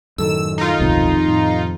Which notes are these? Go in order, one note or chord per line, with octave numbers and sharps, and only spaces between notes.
F#2 A2 D#3 A4 E6
D#4 F4
D1 B1 F2 G#2 C3
A2